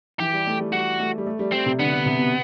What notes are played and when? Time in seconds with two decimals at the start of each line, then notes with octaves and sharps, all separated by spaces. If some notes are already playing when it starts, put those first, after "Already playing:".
0.19 E3 G4
0.33 G3
0.47 A3
0.60 G3
0.72 G3 F#4
1.00 A3
1.18 G3
1.26 A3
1.39 G3
1.52 G3 C4
1.66 C3
1.79 D3 B3
1.92 D3
2.06 C3
2.19 B2